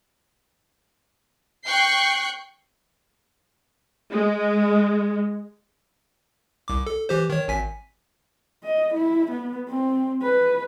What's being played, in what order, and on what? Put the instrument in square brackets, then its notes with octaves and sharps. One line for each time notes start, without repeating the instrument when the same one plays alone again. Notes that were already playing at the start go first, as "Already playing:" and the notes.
[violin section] G5 C#6 F#6 G6 C7 C#7
[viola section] G#3
[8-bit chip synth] C2 D6
A4
E3 G4 C5
D#3 C#5
G#1 G#5 B6
[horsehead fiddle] D#5
E4
B3
C4
B4